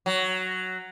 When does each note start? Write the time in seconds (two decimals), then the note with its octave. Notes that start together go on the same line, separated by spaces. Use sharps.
0.06 F#3